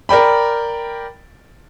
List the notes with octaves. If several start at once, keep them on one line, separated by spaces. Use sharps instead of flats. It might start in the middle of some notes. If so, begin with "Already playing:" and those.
A#4 D5 G5 B5